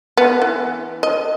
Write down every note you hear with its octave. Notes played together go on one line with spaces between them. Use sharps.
B3
E3
D#5